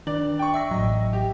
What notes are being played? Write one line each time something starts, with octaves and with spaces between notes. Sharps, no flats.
D#3 D4 D5 F#7
G5 C#6
E5 E6 A#6
A1 F#3 D#5
G4